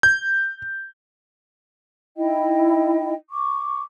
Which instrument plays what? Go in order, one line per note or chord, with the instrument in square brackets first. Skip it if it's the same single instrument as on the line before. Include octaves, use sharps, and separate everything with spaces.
[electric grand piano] G6
[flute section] D#4 E4 D#5 G5
C#6 D6